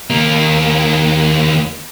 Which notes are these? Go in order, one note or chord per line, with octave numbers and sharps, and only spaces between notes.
D#2 A#3